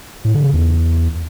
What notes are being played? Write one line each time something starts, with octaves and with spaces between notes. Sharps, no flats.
A2
D3
C#3
E2